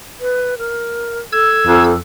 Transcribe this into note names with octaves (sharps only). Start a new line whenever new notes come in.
B4
A#4
A4 E6 G#6
F2